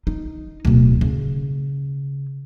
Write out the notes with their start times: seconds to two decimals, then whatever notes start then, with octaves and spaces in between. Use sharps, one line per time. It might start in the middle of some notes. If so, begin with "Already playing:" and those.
0.07 D#4
0.65 D1 B2
1.01 C#3